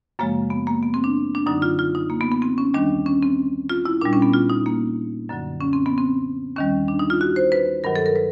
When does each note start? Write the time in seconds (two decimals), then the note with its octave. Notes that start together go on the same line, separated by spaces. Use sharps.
0.19 F#2 C#3 F3 G#3 A#3
0.50 B3
0.67 A#3
0.83 B3
0.94 C4
1.04 D4
1.35 D4
1.46 F#2 D3 F#3 D#4
1.62 F4
1.79 F4
1.95 D#4
2.10 A#3
2.21 B3
2.32 B3
2.42 C4
2.58 C#4
2.74 D#2 D#3 G3 D4
3.06 C#4
3.22 C4
3.69 F4
3.85 E4
4.01 A#2 G3 D4
4.13 C#4
4.22 B3
4.34 F4
4.50 D#4
4.66 A#3
5.29 F#2 D3 F#3
5.61 C#4
5.73 C4
5.86 B3
5.98 C4
6.56 D#2 D#3 G3 C#4
6.88 D4
6.99 D#4
7.10 F4
7.21 F#4
7.36 C5
7.52 B4
7.84 G2 D#3 F#3 A#4
7.96 A4
8.06 A#4
8.16 B4